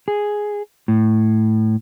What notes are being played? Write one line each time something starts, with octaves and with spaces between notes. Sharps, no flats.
G#4
A2